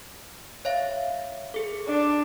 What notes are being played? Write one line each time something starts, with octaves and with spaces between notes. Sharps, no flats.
C#5 E5 F5
G#4 A4
D4